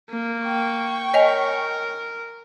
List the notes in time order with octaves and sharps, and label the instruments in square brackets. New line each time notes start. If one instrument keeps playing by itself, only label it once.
[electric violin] A#3
[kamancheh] G5 C#6
[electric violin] A#4 [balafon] C#5 D#5 G#5